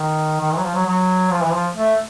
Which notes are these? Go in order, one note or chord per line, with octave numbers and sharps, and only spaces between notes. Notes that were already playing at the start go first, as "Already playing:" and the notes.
Already playing: D#3
D#3
E3
F#3
F3
F#3
F#3
F3
E3
F3
A3